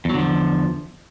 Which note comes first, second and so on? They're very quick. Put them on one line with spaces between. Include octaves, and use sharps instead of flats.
E2 F#3 D3 F3